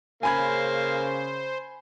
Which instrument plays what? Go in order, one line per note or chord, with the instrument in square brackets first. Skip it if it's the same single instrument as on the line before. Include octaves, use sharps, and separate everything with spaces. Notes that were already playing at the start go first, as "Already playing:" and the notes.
[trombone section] C#3 [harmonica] A#3 [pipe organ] C5 [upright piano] G#5 B5 G#6